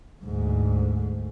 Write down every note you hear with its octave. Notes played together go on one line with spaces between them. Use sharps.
D2 G#2